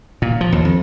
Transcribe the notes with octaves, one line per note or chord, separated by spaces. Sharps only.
A#2
F3
D#2
F2